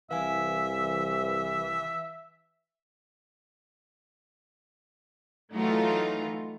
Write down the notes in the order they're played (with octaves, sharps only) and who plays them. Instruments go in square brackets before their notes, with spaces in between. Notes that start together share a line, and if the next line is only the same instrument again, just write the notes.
[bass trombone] C2 [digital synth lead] E3 [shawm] E5 [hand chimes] F5 G#5
[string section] E3 F#3 A3 D#4 F4